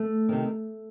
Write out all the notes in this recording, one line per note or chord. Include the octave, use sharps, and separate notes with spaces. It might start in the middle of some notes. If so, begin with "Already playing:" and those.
Already playing: A3
C3 D#3